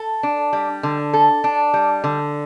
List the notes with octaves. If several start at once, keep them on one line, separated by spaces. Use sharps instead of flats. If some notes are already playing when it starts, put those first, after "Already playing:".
Already playing: A4
D4
G3
D3
A4
D4
G3
D3